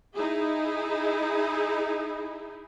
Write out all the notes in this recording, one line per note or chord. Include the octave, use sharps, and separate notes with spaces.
D#4 E4 G#4